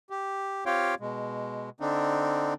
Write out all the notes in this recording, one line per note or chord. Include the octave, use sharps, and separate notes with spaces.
G4
C4 F4 G4 C#5 F5 G5
B2 G#3
D3 C4 D4 D#4